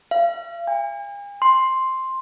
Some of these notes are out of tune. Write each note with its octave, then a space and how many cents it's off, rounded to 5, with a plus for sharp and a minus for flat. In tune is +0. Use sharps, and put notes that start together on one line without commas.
F5 -40
G#5 -45
C6 +5